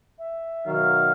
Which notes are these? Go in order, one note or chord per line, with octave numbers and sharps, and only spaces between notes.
E5
B2 D#3 F#3 F5